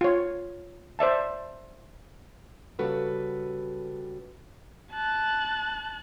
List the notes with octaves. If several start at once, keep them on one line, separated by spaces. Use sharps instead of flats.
F4 C#5
C5 D5 E5 A5
C#3 G3 F#4 A4 B4
A5 F#6